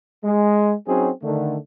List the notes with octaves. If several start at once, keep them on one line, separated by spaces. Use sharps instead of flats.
G#3
F#3 C4 C#4 D#4 F#4 G#4
D3 D#3 A3